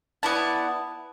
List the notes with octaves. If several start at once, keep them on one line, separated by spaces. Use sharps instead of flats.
B3 E4 D5 A5